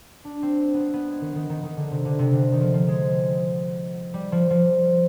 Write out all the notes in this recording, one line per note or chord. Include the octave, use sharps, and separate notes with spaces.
D4
C4
B3
C4
B3
G#3
D#3
D#3
D#3
D#3
D3
C3
D3
C3
D3
D#3
F3
F3
G#3
G3
F3
F3